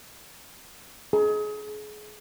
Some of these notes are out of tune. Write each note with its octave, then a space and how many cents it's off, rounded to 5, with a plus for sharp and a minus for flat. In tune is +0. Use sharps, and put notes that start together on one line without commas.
G#4 +30